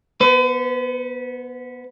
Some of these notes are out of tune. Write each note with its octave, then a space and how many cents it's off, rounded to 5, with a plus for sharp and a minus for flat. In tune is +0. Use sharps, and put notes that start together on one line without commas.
B3 -15 B4 +45